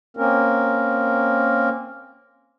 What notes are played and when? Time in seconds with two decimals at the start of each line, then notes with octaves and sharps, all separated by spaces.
0.17 A#3 C4 C#4 A#4